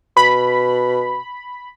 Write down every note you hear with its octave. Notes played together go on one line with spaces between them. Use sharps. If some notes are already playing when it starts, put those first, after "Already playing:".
B2 B5